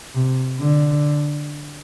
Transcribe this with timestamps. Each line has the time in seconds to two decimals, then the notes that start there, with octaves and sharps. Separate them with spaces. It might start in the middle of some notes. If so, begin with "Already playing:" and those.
0.15 C3
0.60 D3